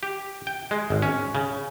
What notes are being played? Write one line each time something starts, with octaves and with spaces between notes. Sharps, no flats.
G4
G5
G#3
G#1
C#4
C#3